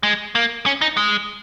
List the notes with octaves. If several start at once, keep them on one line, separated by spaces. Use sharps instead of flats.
G#3
A#3
C#4
D#4
G#3